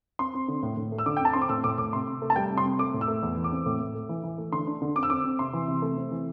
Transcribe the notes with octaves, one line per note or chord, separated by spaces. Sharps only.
C4 C6
C4
D3
A2
A2
A3
E6
D3 D6
G5
C4 A5
C4 C6
D6
A2 E6
A2 D6
A2 D6
C3 C6
C3
A3
A5
G3 G5
C3
C6
C4
A3 D6
A2
E6
A3
E2
E3
D6
C4
A2
A2
A3
E3
E3
A3
D3 C6
D4
D3
C4 D6
E6
C4 D6
C4
C3 C6
E3
C3
A3
C4
E3